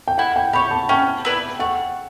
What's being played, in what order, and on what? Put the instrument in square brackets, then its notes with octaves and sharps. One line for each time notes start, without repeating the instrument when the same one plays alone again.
[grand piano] G5
[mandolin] E4 [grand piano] F#5
[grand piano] G5
[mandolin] G4 C#5 [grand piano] B5
[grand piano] A5
[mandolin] C#4 [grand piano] G5
[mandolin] E4 B4 D5
[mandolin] A3 [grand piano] F#5